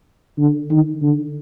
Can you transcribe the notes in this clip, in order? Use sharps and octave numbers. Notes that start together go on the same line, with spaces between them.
D3
D#3
D3